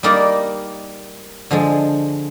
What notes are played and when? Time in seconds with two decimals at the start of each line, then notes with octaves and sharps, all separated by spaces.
0.03 G3 A#3 D#4 A#4 D5
1.51 D3 F3 G#3